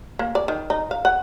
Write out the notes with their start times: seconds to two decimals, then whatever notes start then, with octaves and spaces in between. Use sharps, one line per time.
0.19 A#3
0.35 D5
0.48 D#3
0.70 D#4
0.91 F5
1.05 F#5